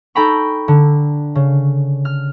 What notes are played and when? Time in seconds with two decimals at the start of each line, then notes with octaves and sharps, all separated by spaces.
0.15 D#4 A4 G5 A#5 B5 C#6
0.68 D3
1.35 C#3
2.05 F6